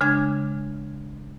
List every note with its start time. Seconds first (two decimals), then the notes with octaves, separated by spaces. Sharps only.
0.01 C#3 G#3 D4 G#6